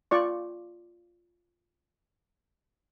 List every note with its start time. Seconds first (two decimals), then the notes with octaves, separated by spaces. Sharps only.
0.11 F4 D5 C#6